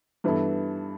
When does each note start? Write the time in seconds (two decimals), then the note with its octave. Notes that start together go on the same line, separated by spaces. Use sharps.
0.24 G2 E3 B3 E4 A4